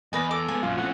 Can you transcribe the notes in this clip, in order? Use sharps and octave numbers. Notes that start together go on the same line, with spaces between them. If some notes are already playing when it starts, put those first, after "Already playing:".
E2 B4 D5 D#5 G#5 A#6
A4 D6
G#3 B3 G#5
A#1 F#2 F4 F5
A2 F3 C4 C#4 F#5